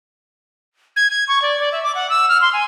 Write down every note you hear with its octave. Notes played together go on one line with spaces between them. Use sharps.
G#6
G#6
C#6
D5
D5
E5
D6
F#5
E6
F6
C6
G#5